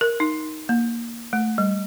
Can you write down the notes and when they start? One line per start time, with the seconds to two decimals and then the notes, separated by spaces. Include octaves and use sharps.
0.01 A#4
0.20 D#4
0.69 A#3
1.33 A3
1.58 G3